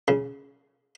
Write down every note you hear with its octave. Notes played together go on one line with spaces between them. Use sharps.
C#3